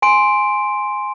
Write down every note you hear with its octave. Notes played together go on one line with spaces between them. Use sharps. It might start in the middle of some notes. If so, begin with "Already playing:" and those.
G#5 C6 D7